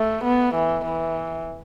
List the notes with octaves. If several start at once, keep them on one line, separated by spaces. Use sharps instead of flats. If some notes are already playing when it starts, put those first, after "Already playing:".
Already playing: A3
B3
E3
E3